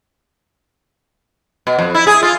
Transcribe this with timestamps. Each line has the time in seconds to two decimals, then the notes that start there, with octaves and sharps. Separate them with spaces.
1.67 B2
1.79 F2
1.95 E4
2.07 G#4
2.23 F4